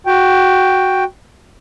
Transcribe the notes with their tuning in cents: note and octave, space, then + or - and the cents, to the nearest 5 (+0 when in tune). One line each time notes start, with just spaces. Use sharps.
F#4 +0 G5 +0